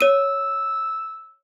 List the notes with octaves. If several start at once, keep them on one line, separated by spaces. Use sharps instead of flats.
C#5 E6 D#7